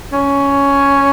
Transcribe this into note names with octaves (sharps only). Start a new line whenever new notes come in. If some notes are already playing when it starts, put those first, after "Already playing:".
C#4